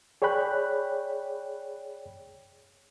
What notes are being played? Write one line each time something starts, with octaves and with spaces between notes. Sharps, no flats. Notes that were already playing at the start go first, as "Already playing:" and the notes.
G#4 C#5 D5 G5 B5 F#6